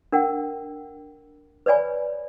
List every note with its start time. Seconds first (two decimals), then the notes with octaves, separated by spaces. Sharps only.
0.12 D4 A#4 F#5 G5
1.66 B4 C#5 D5 G#5 B5